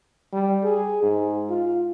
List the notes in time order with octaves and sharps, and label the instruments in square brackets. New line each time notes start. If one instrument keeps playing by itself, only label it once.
[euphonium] G3
G#4
G#2
F4